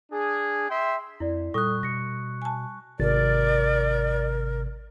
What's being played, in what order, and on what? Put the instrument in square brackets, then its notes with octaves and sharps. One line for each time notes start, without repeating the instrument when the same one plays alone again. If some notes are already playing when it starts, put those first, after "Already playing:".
[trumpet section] D4 G#4
E5 G5 C6
[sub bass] F2 [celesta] E4 D5
[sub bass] A#2 [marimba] G3 [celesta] A4 D#6 [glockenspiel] C#6 F#6
[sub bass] B2 [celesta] A#6 C#7
[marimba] G#5 A5
[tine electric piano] G#1 C3 A6 [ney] A#4 [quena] D5